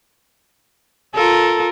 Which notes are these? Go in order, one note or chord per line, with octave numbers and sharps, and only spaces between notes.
F4 A4 A#4